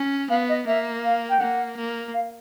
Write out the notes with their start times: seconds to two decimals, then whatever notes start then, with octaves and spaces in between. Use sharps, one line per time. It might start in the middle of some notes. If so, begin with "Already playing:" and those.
Already playing: C#4
0.30 B3 F5
0.49 D#5
0.67 A#3 E5
1.04 F5
1.30 G5
1.40 A#3 F#5
1.77 A#3
2.14 F5